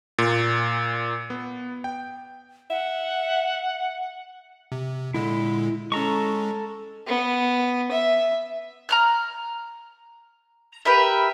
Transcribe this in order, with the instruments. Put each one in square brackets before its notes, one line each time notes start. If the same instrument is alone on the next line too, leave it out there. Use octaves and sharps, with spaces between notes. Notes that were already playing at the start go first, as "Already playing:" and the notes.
[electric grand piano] A#2
B3
G5
[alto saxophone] E5 [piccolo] F#5
[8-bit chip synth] C3
[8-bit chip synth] A#2 D3 G#3 [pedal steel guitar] E4
[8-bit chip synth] G#3 C#4 [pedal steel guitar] A4 A#5 C#6
[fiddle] B3
E5
[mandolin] A#5 F6 F#6
G4 A#4 B4 E5